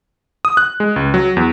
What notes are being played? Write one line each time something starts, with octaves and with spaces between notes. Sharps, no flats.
D#6
F#6
G#3
C#2
F#3
E2